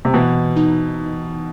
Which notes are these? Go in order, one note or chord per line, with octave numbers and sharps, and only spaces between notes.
C3
B2 E3
D#4